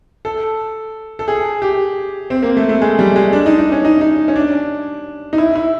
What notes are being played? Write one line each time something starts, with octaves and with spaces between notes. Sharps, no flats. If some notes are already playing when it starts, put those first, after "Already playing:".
A4
A4
G#4
G4
C4
A#3
A3
A3
G#3
G3
G#3
D4
D#4
D#4
C#4
D#4
D#4
C#4
D4
D#4
E4
E4